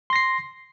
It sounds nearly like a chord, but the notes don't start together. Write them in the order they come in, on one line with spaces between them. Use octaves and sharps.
C6 A#6 C7